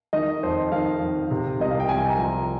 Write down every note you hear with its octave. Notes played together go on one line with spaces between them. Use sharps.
D#3 D#5
F2 C5
D#3 F5
F2
C3
C2 D#5
F5
G5
C2 G#5
A#5
F3